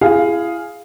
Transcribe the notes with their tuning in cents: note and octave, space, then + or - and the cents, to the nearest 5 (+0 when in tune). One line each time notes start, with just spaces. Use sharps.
E4 +30 G#4 +0 F5 +0